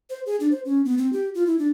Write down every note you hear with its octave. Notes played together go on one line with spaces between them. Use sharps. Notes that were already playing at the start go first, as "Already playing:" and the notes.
C5
G#4
D4
C5
C#4
B3
C4
G4
F4
E4
D4